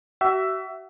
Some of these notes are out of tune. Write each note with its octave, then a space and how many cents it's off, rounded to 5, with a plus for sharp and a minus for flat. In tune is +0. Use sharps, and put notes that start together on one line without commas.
F#4 +40 E5 +10